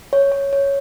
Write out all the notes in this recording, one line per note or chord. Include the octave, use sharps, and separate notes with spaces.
C#5
C#5
C#5